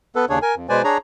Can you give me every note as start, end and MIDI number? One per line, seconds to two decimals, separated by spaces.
0.16 0.25 59
0.16 0.25 69
0.16 0.25 71
0.29 0.39 39
0.29 0.39 49
0.29 0.39 62
0.29 0.39 68
0.29 0.39 73
0.42 0.55 70
0.42 0.55 80
0.56 0.67 41
0.69 0.82 47
0.69 0.82 56
0.69 0.82 71
0.69 0.82 72
0.69 0.82 74
0.69 0.82 80
0.84 0.98 62
0.84 0.98 68
0.84 0.98 73
0.84 0.98 82